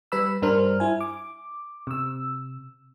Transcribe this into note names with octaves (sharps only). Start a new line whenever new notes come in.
G3 B4 B5 E6
G2 G3 D4 A#4 C5 F6
E4 G#5
D6
C3 E6